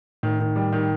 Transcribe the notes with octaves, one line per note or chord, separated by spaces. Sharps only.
A2 D#3
D#3
G3
D#3